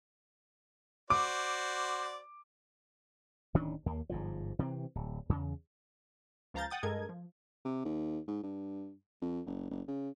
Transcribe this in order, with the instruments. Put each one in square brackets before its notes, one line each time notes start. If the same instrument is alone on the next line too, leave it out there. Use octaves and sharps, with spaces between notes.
[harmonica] F#4 C5 D5 [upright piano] D6
[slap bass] D1 D#3 C#4 D4
D#2 A#3
G1 G#2 F3
C3 E3 F#3 C4
D1
E2 C#3
[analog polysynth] C#2 F3 F5 A#5 G6 A6
F#5 G5 D#6 A6
G2 G#3 A4 A#4 D#5 G#6
F3
[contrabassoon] C3
D#2
G#2
G2
F2
F#1
F#1
C#3